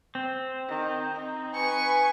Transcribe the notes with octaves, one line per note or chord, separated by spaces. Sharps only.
C4
D#3
D#4
B4 G#5 C#6